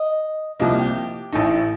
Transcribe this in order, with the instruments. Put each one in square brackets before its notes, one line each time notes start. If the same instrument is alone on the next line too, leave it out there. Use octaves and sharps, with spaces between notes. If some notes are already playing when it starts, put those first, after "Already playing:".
Already playing: [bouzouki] D#5
[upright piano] C2 C3 F3 A#3 [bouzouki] D#5
[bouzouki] G4
[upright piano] A1 A2 A3 D#4